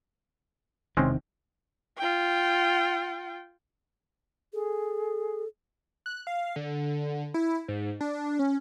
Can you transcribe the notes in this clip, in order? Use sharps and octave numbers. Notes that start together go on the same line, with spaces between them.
E1 C3 D#3 G#3 C4 C#4
F4 G5
G#4 A4
F#6
F5
D3
E4
G#2
D4
C#4